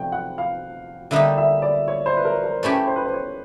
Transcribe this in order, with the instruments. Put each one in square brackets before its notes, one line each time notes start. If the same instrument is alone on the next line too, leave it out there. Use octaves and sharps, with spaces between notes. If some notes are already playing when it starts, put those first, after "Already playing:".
Already playing: [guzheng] C3 F3 A3 D4 [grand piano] G5
[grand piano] F#5
F5
[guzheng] D3 G3 A#3 D#4 G4 [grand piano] E5
[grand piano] E5
D5
C#5
C5
B4
A#4
A#4
[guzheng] A3 C#4 E4 G4 [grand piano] B4
[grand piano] C5
B4
C5
C#5